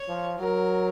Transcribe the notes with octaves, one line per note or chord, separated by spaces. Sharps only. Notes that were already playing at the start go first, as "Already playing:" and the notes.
Already playing: C#5
F3
F#3 A#4